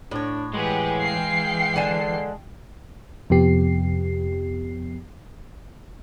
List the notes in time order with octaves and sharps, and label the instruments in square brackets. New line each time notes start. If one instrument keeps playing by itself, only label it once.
[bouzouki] A2 C#5 [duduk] D4
[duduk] E3 [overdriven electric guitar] G#3 G#4 [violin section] G4 B4 F#5
[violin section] F5 G5 C7
[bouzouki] D3 G#5 A5
[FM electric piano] F2 C3 F3 B3 G4 C7